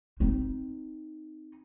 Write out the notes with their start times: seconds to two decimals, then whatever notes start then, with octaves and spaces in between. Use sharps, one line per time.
0.20 C4 D#4